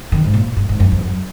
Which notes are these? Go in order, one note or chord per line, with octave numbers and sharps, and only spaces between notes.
D#3
G#2
A#2
G#2
G#2
F#2
F2
F#2